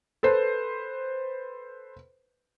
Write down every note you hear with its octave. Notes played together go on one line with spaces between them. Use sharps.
A4 B4 C5